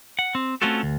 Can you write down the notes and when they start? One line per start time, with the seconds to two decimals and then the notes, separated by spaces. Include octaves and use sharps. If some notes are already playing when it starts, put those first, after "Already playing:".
0.19 F#5
0.35 C4
0.62 A3 C4 C#4 F4 F#4 A4
0.83 D2